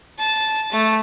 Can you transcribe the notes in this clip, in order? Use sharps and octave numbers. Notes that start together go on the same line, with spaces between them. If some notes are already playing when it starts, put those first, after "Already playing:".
A5
A3